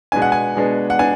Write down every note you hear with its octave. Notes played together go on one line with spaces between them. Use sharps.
B2 G#3 B3 D4 G#5
F#5
G#5
B2 G#3 B3 D4
F#5
B3 D4 G#5